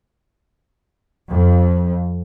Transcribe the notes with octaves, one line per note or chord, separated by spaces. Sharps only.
F2